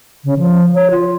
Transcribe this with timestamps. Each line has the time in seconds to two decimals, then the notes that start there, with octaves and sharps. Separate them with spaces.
0.24 C#3
0.39 F3
0.75 C#5
0.91 F4